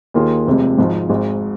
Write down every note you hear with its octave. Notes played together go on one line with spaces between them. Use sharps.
D#2 D#3 A#3 F4 G#4
F1 F2 C3 G#3
G#1 G#2 F3 G#3 D#4
G#1 G#2 G#3